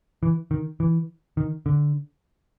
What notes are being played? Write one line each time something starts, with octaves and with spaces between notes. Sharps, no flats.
E3
D#3
E3
D#3
D3